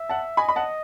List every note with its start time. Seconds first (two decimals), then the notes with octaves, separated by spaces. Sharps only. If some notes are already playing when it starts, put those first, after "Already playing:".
Already playing: E5
0.09 F#5 A5
0.37 D#5 G#5 B5
0.49 B5
0.56 F#5 A5